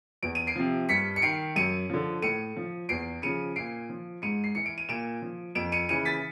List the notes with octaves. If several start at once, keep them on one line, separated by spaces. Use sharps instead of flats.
E2 D7
D#7
C7 D7
C3 F3
G2 B6 C#7
C#7
D#3 C7 D7
F#2 C#7 D#7
D3 F3
A2 C#7 D#7
F3
E2 C7 D7
C#3 F3 C#7 D#7
A#2 C7 D7
F3
G#2 C#7 D#7
C7
E3 C#7
D7
D#7
A#2 D7 E7
F3
F2 D7 E7
C#7 D#7
C#3 E3 C#7 D#7
A6 B6